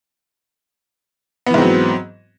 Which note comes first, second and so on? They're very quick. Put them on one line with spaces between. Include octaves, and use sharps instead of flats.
B3 E3 G#2 C4 F#3